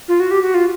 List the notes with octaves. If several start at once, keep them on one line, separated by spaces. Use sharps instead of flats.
F4
F#4
G4
F#4
F4